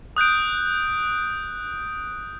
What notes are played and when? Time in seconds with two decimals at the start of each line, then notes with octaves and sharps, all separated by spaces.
0.17 D#6 F#6 G6 D7